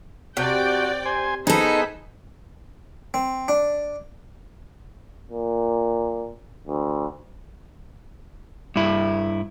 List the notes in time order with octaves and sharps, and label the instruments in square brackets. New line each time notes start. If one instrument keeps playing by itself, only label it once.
[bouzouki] C3 [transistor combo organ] F#4 [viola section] D5 G5
[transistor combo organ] C5 G#5
[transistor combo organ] B3 G#4 [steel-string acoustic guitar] D#4 A4 [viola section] C5 B5
[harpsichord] C4
D4
[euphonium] A#2
D2
[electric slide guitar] G2 E4